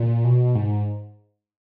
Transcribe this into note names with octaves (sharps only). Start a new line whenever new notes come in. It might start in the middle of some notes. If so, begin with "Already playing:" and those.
Already playing: A#2
B2
G#2